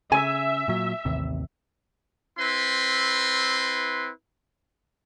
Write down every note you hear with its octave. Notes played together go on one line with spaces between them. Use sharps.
C#3 E5 G#5
A#2 F#3
A1 D#2 C3
C4 E4 B4 C6